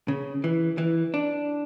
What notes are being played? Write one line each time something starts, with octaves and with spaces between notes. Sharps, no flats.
C#3
E3
E3
D4